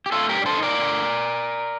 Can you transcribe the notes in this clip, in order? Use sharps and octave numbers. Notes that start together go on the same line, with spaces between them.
G4
A3 F4 A4
G4 A#4
G2
D5
A4 C5
D#4
A#4 D5
D3